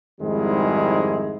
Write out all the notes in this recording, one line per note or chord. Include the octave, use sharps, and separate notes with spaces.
F2 G#2 D#3 G3 G#3 E4